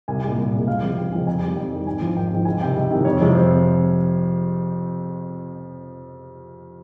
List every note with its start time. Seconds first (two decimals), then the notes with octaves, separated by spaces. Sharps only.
0.08 C2 G#5
0.23 A#2 G#3
0.38 C2
0.53 A#2 G#3
0.67 C#2 F5
0.82 C3 F3 G#3
0.97 C#2 G5
1.12 C3 F3 G#3 G#5
1.26 F2 G#5
1.41 D#3 G3
1.57 F2 G5
1.71 D#3 G3
1.87 G#1 G#5
2.01 G#2 F3
2.15 G#1 G5
2.31 G#2 F3
2.45 C#2 G#5
2.61 C3 D#3 G3 G5
2.76 C#2
2.90 C3 D#3 G3
3.05 F2 C#5
3.21 C3 F3 G#3
3.35 F2 C5